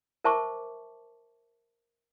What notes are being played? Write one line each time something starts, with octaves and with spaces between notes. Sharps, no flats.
A#4 C5 E5 A5 C#6 D6